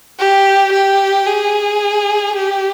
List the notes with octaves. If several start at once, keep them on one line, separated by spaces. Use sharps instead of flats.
G4
G4
G#4
G4